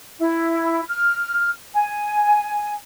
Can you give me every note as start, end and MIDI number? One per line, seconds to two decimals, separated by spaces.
0.19 0.81 64
0.88 1.49 89
1.75 2.74 80